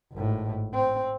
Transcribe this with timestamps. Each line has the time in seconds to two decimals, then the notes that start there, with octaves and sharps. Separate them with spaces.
0.13 G#1 A2
0.74 C4